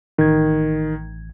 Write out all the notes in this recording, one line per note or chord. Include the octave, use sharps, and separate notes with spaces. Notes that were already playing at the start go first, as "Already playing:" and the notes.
A1 D#3 G#6